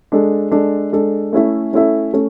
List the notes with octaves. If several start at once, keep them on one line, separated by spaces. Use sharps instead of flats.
G#3 D4 A4
G#3 D4 A4
G#3 D4 A4
A3 C#4 E4 A4 E5
A3 C#4 E4 A4 E5
A3 C#4 A4